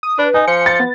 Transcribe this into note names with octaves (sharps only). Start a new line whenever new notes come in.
D#6
D4 B4
D#4 G#5
F3 C#7
A6
B3